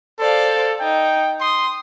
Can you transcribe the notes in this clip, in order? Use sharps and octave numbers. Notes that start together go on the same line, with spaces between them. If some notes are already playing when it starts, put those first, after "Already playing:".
A4 C5 D5 F5
D#4 G5
C6 D#6